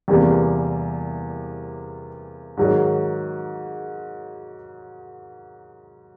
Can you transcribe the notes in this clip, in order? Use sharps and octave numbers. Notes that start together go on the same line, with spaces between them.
E2 C3 E3 G3 A#3
G#2 D#3 F#3